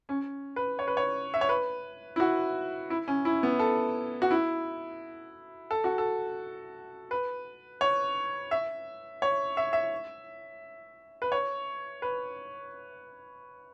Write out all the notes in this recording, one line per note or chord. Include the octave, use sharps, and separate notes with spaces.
C#4
B4
C#5
B4
C#5
E5
C#5
B4
E4
F#4
E4
C#4
E4
B3
A4
F#4
E4
A4
F#4
A4
B4
C#5
E5
C#5
E5
E5
B4
C#5
B4